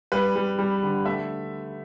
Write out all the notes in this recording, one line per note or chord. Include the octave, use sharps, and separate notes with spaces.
G3 B4
G3
G3
D3
A3 E5